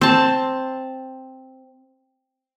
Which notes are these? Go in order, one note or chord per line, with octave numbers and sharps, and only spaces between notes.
C4 A5